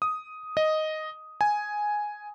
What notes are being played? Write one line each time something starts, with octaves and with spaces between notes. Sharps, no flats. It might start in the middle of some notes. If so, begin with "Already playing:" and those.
D#6
D#5
G#5